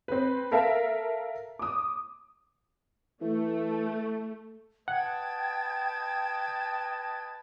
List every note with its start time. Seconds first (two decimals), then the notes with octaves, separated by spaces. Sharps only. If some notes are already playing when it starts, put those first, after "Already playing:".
0.08 C4 B4
0.52 A4 A#4 E5 F5 A5
1.59 D6 D#6
3.22 E3 A3
4.88 B4 D#5 F#5 G5 A5 G#6